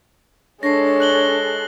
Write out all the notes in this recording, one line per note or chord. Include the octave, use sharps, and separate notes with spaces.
G#3 D4 A4 C#5 A#6 C7
F#6 F#7 G7